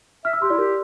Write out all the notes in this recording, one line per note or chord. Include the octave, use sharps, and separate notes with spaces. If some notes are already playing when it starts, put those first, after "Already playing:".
E5 F6
E6
G4 C6
E4 D5
G4 A#4